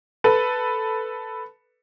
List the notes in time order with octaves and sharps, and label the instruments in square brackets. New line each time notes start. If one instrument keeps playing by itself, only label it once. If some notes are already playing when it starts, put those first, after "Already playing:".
[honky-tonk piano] A4 B4